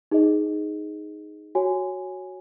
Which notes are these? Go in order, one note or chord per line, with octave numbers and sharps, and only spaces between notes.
D#4 G#4 D#5
F#4 C#5 G#5